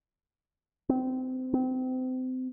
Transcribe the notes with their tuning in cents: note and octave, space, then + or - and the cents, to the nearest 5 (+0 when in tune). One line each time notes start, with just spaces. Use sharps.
C4 -25
C4 -30